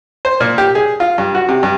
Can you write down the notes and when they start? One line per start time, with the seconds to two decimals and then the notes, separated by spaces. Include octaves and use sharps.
0.25 C5
0.40 A#2
0.58 G4
0.75 G#4
1.00 F4
1.18 G2
1.35 F#4
1.49 C3
1.63 G2